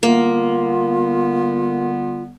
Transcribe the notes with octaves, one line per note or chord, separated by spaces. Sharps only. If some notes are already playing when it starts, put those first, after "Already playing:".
D3 G3 A#3 B3 F4